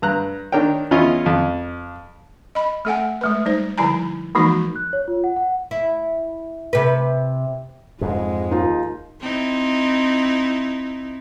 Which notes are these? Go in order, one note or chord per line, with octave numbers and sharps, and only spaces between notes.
G2 A#5 F#6
D#3 D4 A#4 C#5 G5
E2 C#4 E4 F4 D#5
F2
D#5 B5
A3 A4 F#5 G#5
G#3 A3 B4
G3 D#4 C5
D3 F3 G3 E4 G#5 A#5
E3 F3 G#3 A#3 D#4 F#4
F#6
C#5
F4
F#5
F#5
E4
C3 B4
F2 G#2 G#3
D#2 D#4 F4
C4 D#4 E4